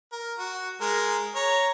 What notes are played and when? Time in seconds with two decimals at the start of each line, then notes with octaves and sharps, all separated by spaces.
0.12 A#4
0.39 F#4
0.81 G#3 A#4
1.35 C#5 A#5